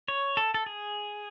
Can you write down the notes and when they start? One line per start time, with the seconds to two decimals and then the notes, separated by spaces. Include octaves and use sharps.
0.08 C#5
0.37 A4
0.54 A4
0.66 G#4